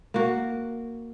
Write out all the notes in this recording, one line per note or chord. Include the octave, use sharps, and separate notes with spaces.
A#3 F#4